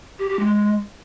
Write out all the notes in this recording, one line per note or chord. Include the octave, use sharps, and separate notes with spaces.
G4
G4
G#3